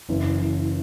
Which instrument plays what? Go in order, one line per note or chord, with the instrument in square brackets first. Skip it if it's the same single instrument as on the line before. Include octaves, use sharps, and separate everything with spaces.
[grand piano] F#1 F#2 E3